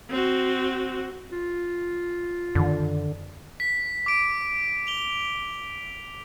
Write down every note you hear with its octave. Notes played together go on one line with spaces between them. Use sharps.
C4 F#4
F4
F#2 D3 D#3
B6
D6 D7
F7 G7